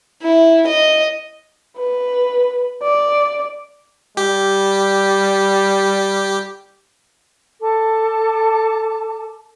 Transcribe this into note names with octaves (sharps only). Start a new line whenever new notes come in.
E4
D#5
B4
D5
G3 G4
A4 A5 D6